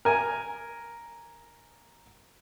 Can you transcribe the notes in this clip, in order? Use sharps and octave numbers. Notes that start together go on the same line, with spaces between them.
A#4 G#5